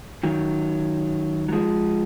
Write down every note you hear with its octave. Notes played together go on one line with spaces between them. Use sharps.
D#3 F#3
F#3
F3 G#3